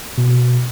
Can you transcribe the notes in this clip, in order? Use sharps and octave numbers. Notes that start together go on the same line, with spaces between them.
B2